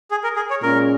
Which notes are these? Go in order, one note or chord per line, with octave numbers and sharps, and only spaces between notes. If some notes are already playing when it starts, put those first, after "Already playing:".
G#4
A#4
G#4
C#5
A#2 G#3 C#4 A#4